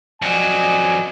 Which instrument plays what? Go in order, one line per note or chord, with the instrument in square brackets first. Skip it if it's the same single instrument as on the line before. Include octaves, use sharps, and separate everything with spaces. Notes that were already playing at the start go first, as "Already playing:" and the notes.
[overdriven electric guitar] F2 F#3 [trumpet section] D5 D#5 G#5